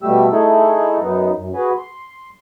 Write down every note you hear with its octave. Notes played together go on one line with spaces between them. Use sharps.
B2 G3 A3 G4 E6
A3 D#4 E4 G#4 A4
F#2 B3 D#4
F#2
F#4 G#4 B4
C6